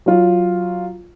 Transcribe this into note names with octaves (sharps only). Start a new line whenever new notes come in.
F#3 F4